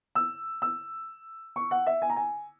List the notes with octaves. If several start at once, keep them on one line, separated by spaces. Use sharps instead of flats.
E6
E6
C#6
F#5
E5
G#5
A#5
G#5